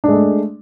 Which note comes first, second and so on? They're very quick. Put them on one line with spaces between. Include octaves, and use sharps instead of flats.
D4 G#3 A3